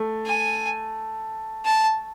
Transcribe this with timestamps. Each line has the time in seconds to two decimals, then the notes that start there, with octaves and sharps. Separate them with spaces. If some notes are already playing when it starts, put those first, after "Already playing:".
Already playing: A3
0.26 G#5
1.65 A5